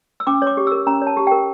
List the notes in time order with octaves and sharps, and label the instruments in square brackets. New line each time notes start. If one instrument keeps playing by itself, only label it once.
[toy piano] E6
C#4 D6
C#5 D6
G4
A#4 E6
C#4 A#5
C#5
A5
G4
A#4 G5